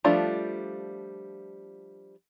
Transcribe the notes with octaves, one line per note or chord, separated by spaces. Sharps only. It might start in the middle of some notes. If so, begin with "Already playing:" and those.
F3 G3 A3 D4 F4